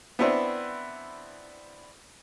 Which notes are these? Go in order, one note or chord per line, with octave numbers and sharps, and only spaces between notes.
B3 C4 D4 E4 B4 C5